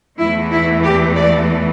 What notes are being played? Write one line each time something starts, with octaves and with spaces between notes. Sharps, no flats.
E2 E3 A3 E4
E4
G4
D5